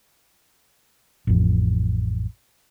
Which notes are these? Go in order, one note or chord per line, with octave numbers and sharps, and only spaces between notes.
A1 F2